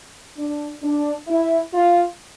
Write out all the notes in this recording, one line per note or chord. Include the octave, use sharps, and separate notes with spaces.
D4
D4
E4
F4